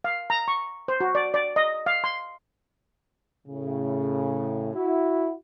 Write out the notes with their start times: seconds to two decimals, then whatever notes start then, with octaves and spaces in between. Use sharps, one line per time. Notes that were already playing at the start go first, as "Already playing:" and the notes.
0.04 F5
0.30 A#5
0.48 C#6
0.88 C5
1.00 F#4
1.15 D5
1.34 D5
1.56 D#5
1.86 F5
2.04 C6
3.47 A2 C#3
4.75 E4 F#4